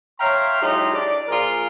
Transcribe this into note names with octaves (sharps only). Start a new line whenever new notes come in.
C#5 E5 F5 G5 A#5 C6
F#3 G#3 D#4 E4 G4 A4
D4 D5
A#2 F3 F4 G#4 A#4